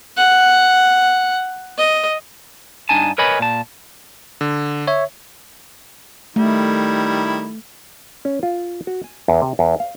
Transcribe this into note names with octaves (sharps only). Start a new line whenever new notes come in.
F#5
D#5
G2 D4 D#4 G#5 A5
A#4 B4 C#5 D#5 G#5 B5
A#2 A5
D3
C#5 E5
D#3 G3 A3 E4
C#4
F4
F#4
G#5
E2
C3
E2
F5